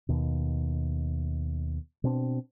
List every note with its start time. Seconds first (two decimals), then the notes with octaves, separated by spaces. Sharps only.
0.09 D#2 B2
2.04 B2 C4 D4